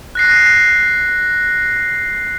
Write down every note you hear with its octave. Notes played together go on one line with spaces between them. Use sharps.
F#6 A#6 C7